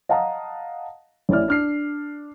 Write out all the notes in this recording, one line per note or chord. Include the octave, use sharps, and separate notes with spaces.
D#5 F5 F#5 A5 A#5 D#6
A1 C#4 E4 D5 F6
D4 F6 C7